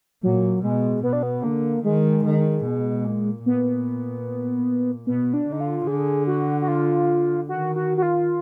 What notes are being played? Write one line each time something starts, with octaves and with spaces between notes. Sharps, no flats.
A#2 F#3
B2 G#3
B2 B3
D4
B3
D3 A#3
D#3 G#3
D#3
B2
A#2
A#2 B3
B2 B3
D4
D3
D#4
F4
D3 G#4
F#4
F#4
F4
D#3 F#4
F#4
F#4
F4